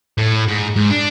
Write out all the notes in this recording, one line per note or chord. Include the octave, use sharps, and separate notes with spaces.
A2
G#2
G#2
D4